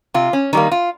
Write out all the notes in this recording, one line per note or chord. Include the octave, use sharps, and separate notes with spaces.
C3 F4
C#4
D#3 G3 A#3 D#4
F4